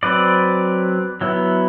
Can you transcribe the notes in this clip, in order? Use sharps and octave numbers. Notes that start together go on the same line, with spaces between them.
F#3 C4 B4 D5
F#3 B3 E4